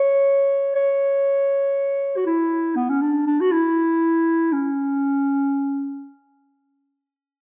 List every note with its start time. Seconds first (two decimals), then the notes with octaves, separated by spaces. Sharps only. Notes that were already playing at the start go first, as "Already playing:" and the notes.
Already playing: C#5
0.75 C#5
2.17 F#4
2.26 E4
2.76 B3
2.89 C#4
3.02 D4
3.27 D4
3.41 F#4
3.52 E4
4.53 C#4